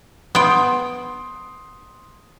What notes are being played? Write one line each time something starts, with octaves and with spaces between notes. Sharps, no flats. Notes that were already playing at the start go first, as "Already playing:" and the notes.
B3 G5 C6 D#6